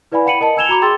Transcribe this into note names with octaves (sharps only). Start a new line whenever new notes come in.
E4 B4 D5 F5 G#5 B5
F#5 G5 B5 C#7 D#7 F#7
A#4 D#5 A5 C#7
G#5 E6 G#6 E7 F7 G7
F#4 A#5 B5 D6
G#4 G5 C6 E6 A6